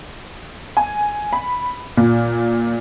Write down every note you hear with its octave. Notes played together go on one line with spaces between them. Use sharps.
G#5
B5
A#2